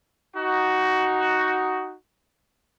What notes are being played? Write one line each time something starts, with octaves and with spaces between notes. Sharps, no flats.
D#4 F#4